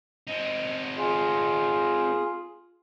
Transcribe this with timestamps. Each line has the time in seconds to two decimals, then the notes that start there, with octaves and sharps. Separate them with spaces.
0.27 C4 D#4
0.97 F4 G#4